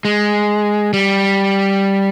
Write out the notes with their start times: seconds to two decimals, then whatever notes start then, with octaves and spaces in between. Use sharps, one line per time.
0.05 G#3
0.93 G3